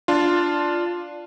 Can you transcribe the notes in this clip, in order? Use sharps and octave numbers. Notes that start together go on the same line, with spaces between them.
D4 F4